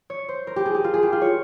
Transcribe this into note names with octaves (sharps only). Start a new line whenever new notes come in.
C#5
C5
A#4
G4
G#4
G4
F4
G#4
G4
F4
C#5